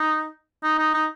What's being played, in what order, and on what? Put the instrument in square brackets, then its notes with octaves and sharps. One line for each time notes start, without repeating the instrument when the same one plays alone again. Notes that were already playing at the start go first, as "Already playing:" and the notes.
Already playing: [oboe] D#4
D#4
D#4
D#4